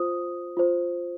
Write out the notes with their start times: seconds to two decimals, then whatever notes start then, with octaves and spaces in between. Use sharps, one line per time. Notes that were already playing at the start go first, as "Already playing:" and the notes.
Already playing: F4 C5 D#6
0.57 F4 C5